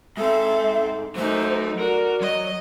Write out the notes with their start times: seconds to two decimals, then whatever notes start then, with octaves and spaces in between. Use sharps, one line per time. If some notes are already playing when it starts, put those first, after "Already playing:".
0.18 G#2 C4 A4 E5
1.16 F#3 A3 D#4 C5 E5
1.79 F#4 A#4 D5
2.22 F#3 D#5